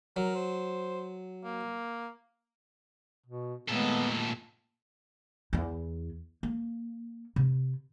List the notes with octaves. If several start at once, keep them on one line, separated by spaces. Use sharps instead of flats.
F#3 A#4
C5
A#3
B2
A#2 D#3 G#3 A3 B3 A4
E2 E4
A#3
C3